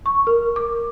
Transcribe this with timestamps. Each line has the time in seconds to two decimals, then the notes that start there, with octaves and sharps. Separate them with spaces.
0.06 C#6
0.27 A#4
0.56 D6